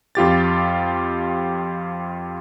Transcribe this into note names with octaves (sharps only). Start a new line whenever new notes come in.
F2 F4 G4 A6